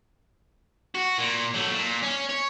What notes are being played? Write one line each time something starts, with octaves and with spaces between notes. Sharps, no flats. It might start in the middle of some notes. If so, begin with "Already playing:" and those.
F#4
A#2
F#3 A3
A#2
C#4
C#5